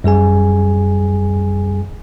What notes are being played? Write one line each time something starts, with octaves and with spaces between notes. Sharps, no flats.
F#2 G3 G#4 G#5